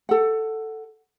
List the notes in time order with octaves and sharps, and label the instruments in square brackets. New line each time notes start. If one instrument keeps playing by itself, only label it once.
[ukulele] A4 F#5